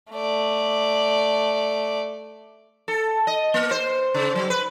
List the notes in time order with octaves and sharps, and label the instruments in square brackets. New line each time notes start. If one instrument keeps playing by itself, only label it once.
[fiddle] A3 D5
[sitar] A4
D#5
A#3
C5
C#3
F#3
B4